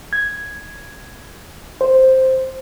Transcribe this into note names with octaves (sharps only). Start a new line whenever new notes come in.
G#6
C5